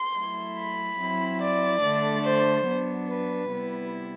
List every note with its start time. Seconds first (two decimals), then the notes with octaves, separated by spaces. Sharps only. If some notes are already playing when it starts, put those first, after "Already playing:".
Already playing: C6
0.17 F#3 A3 E4
0.58 B5
1.00 F#3 C4 E4
1.41 D5
1.82 D3 A3 D4
2.24 C5
2.66 F#3 B3 D4
3.08 B4
3.49 C3 G3 B3 E4